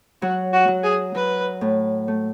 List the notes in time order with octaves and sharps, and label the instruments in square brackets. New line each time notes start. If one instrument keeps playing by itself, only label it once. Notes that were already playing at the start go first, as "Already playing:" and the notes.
[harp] F#3 [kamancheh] F#4
[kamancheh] F#4
[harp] F#3
[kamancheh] G#4
[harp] F#3 [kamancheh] B4
[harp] A2
A3